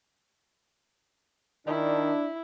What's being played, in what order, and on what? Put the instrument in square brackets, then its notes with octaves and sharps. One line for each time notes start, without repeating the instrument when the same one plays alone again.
[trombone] D#3 [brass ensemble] D4 [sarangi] E4